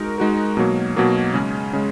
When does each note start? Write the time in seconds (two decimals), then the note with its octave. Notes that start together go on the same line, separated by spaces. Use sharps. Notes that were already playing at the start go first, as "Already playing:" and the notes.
Already playing: G#3 D#4 F#4 A#4
0.18 G#3 D#4 F#4 A#4
0.57 B2 F#3 A#3
0.96 B2 F#3 A#3
1.34 C#3 G#3 C#4
1.73 C#3 G#3